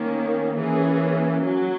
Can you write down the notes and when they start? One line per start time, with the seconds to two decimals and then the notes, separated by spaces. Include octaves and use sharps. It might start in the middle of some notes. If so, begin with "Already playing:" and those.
Already playing: D#3 A#3 C#4
0.56 E3 A#3 C#4 G#4
1.45 F#3